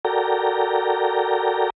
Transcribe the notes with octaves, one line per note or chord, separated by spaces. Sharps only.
F#4 A4 A#4 D5 G5 A#5